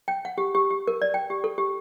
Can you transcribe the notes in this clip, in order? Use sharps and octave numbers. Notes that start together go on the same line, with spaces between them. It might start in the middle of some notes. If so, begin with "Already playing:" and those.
G5
F#5
G4
G4
G4
A#4
D5
G5
G4
A4
G4